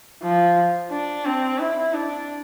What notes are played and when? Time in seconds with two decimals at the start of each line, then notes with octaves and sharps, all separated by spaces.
0.23 F3
0.92 D4
1.26 C4
1.59 E4
1.94 D4